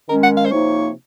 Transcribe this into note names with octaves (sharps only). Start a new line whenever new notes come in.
D#3 G#3 C#4 A#4
F#5
F5
C5
C3 F3 A#3 D#4 C#5